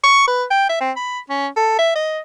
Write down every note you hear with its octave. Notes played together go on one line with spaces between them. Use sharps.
C#6
B4
G5
E5
C4
B5
C#4
A4
E5
D#5